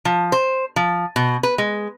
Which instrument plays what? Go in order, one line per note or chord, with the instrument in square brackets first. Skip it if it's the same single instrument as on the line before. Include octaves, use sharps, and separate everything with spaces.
[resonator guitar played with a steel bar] F3
C5
F3
B2
B4
G#3